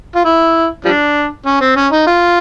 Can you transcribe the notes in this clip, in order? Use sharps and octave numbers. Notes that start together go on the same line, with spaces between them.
F4
E4
F3 G3 D4
C#4
C4
C#4
D#4
F4